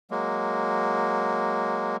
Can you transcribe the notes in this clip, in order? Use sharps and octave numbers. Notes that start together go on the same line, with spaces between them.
F#3 G#3 A#3